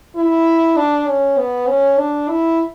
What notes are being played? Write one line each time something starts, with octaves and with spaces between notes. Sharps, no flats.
E4
D4
C#4
B3
C#4
D4
E4